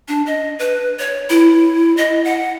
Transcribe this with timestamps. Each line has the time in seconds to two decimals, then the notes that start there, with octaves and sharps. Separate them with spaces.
0.08 D4
0.26 D#5
0.59 B4
0.99 C#5
1.30 E4
1.97 D#5
2.24 F#5